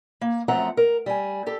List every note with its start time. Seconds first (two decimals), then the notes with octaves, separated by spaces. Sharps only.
0.21 A#3
0.48 F#2 F3 A3 C4 F#5 A#5
0.77 A#4
1.06 G3 G#5
1.46 G4 A4